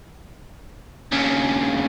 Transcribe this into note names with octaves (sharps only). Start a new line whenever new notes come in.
D#2 C#3